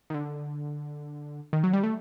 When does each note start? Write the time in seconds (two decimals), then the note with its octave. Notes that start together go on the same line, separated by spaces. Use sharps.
0.10 D#3
0.14 D3
1.53 D#3
1.63 F#3
1.73 G3
1.83 A3